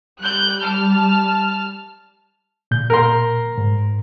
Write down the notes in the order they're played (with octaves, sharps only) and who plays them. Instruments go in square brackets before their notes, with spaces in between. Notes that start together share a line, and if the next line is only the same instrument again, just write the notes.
[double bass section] G3 [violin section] F#6 G6
[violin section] A5 F6
[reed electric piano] A#2 G6
[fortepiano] A#4 C6
[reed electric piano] G#2